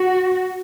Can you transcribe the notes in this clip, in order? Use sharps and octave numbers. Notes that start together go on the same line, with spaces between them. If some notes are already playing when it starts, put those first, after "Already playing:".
Already playing: F#4